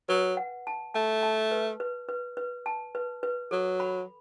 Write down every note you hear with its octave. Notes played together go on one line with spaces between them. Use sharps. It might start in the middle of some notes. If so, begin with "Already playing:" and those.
F#3 B4
F#5
A5
A3 A5
A5
B4
B4
B4
B4
A5
B4
B4
F#3 A4
B5